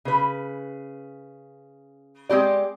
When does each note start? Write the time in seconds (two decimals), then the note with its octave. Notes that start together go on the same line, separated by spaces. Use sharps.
0.05 C#3 B4
2.29 G#3 C4 G4 D5